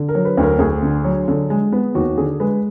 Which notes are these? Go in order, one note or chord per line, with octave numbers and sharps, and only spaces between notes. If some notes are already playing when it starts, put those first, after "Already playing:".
Already playing: D3
A#4
F#3
B4
D2
A#4
D2 G#4
D3
F#3
D3
G#3
B3
D#2 F#4
D3 G#4
G#3 B4